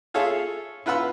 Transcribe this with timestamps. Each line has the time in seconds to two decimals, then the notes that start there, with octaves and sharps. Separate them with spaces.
0.14 F4 G#4 A4 C#5 E5 F5
0.86 E4 F4 B4 F#5 B5 E6